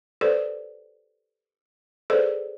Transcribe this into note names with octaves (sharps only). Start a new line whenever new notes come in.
G4 A4 B4 C5 D5
G#4 A4 B4 C5 D5 D#5